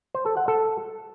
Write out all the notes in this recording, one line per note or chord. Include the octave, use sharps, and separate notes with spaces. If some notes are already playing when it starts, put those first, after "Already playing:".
C5
A4
F#5
A4